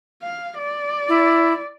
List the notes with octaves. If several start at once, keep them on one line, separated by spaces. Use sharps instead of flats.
F5
D5
E4